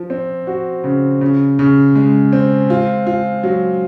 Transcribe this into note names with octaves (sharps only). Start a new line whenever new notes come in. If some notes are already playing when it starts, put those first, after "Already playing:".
Already playing: F3
C4
F#4
C#3
C#3
C#3
G#3
C4
F4
F4
F#3